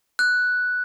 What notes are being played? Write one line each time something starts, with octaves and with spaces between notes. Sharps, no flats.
F#6